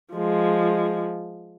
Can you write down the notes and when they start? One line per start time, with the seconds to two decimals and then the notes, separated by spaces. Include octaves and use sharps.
0.14 F3 G#3